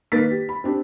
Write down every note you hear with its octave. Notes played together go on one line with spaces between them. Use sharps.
D#3 A#3 A#4 B4 A6 B6
G4
B5
C4 D4 G4